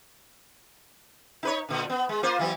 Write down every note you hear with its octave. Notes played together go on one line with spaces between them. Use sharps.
D#4 B4 C#5
A#2 D3
B3
G#3
A#3 F4 C5
E3 F#3 B3